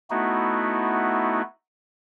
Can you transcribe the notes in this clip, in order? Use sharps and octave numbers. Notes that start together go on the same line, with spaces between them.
A3 B3 D#4 E4 F#4